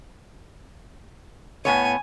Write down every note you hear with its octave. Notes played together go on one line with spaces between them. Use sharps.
A2 B3 C#5 G#5